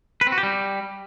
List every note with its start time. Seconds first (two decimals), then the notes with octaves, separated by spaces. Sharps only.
0.21 B4
0.27 C4
0.32 F#4
0.38 G4
0.43 G3